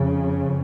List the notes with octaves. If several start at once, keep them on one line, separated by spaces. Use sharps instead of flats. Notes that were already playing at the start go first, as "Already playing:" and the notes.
Already playing: F2 C#3